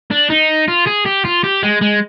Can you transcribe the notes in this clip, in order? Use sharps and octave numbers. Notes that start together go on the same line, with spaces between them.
D4
D#4
F4
G#4
G4
F4
G4
G#3
G#3